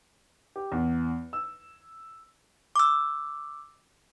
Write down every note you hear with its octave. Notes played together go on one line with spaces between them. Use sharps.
G4
E2
E6
D6 E6